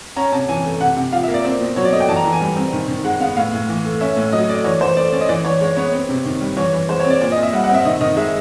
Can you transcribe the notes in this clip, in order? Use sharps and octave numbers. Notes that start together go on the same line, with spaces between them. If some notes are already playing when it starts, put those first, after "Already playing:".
C#4 A#5
C3 A5
E3 G#5
A3
C3 F#5
C3
F3 F5
E5
A#3
D5
C4
B2
F#3 C#5
D5
A3 D#5
G5
E3 A5
A#5
E3
G#5
G3
C4
D#3
D#3
G#3 F#5
B3 F5
A2 F5
A2
E3
A3
C#4 E5
A2
F#3 D#5
A3 D5
E3 C#5
E3 C5
A3 D5
C#4 D5
D#5
E3 D5
E3 C#5
G#3 C#5
B3 C#5
C4
C3
D#3
G3
E3 C#5
E3
G#3 C5
C#5
C4
D5
A#2 D5
D#5
A#2
E5
G3 F#5
F#5
C4
E5
D#3 D#5
D#3 D#5
G#3 E5